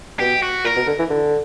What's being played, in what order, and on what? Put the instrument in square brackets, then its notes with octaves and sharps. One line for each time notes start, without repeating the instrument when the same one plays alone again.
[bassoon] B2 [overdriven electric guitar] G4
[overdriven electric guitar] F#4
[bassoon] A#2 [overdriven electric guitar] A#4
[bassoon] B2
D3
E3
D3